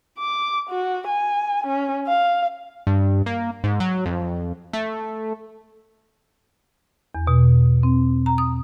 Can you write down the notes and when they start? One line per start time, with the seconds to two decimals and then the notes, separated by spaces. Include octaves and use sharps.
0.19 D6
0.70 F#4
1.07 G#5
1.67 C#4
2.07 F5
2.87 G2
3.26 A#3
3.64 G#2
3.80 F#3
4.06 F2
4.73 A3
7.15 E2
7.27 B2
7.83 C4
8.26 A#5
8.38 D#6